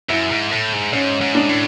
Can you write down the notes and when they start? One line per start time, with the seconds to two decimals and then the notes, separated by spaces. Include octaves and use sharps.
0.09 F#2 E4
0.31 G#2
0.51 A2
0.73 G#2
0.93 G#2 C#4
1.21 G#2
1.35 D4
1.49 A2